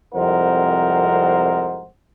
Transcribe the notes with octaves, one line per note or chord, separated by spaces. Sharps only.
C2 F2 G#2 A#4 C5 F#5